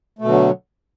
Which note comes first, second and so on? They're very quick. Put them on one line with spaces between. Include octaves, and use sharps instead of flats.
A3 B2 D3 F#3